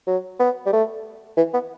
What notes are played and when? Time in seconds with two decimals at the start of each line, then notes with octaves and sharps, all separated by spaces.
0.07 F#3
0.40 B3
0.66 G3
0.73 A3
1.37 E3
1.54 B3